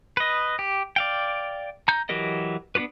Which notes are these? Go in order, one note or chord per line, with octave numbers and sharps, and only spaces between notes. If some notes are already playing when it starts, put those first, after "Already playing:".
B4 D#5
G4
D5 F5 G5
A#5 G6
E3 F#3 G4 A#4 D#5
B3 D4 F4 G4 B4